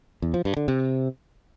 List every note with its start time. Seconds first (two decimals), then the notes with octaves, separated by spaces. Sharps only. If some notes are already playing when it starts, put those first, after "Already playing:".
0.22 E2
0.34 F3
0.45 G2
0.57 D3
0.68 C3